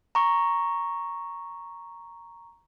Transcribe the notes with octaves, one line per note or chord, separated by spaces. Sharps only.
A#5 C#6